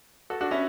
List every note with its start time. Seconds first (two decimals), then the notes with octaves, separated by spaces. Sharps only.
0.30 F#4 A4
0.41 D4 F#4
0.51 C#4 E4